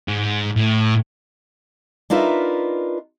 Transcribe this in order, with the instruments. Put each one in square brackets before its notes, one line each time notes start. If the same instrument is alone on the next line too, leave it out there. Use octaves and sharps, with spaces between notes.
[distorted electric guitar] G#2
A2
[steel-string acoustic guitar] D4 D#4 F4 A#4 B4 E5